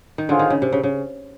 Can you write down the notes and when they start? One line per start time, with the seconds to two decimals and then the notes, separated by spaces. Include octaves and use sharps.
0.18 D#3
0.28 D3 C#4 F4 G#4 C5 F5
0.39 D#3
0.50 C#3
0.62 C3
0.72 C#3
0.83 C#3